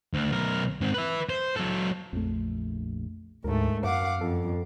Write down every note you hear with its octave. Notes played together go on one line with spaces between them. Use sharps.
D2
B1 A#4
G#2 C4
B4 E5
C5
F#3 A4
A#1 F2 A3
D2 G#2 A3 A#4
F#2 F5 F#5 D6
F2 A4